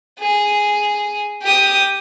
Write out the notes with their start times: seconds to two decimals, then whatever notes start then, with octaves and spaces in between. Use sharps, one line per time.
0.20 G#4
1.43 G4 D#6